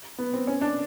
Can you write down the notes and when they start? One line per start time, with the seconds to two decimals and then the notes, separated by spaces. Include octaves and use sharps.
0.18 B3
0.34 C4
0.47 C#4
0.61 D4